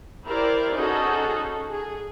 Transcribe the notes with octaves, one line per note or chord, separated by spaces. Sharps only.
E4 G4 A#4 C5 D5
C#4 D#4 F#4 G#4 A4
G#4